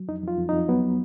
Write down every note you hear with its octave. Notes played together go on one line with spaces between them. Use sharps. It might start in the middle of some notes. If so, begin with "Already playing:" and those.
Already playing: F#3
F2 D#4
F2 F4
F2
D#4
F2
F#3 B3